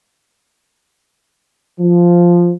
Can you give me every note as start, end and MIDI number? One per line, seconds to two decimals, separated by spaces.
1.80 2.52 53